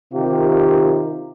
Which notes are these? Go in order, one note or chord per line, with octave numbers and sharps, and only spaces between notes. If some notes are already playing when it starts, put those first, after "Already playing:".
C3 D#3 F4 G4 A#4